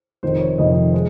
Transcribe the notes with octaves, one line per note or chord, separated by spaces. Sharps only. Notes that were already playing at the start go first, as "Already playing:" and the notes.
F1 F2 C3 D#3 C5
C#5
F1 F2 C3 D#3 D#5
G#3